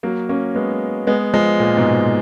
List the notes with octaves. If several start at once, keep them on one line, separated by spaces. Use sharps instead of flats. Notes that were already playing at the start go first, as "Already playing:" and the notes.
F#3 A#3
A#3 C#4
G#3 B3
G#3 B3
F3 G#3
A#2
G#2 B2